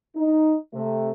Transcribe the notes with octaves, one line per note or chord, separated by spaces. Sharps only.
D#4
C3 A3